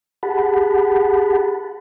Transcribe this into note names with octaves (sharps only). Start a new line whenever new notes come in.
G4 G#4 F#5 A5 B5